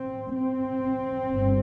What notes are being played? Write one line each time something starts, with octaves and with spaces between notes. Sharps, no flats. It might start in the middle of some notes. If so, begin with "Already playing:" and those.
Already playing: C4
C4
G1 G2